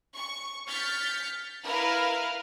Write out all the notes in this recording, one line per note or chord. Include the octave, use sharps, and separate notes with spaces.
C#6
F6 G6 A6 B6 C#7
E4 A#4 B4 F5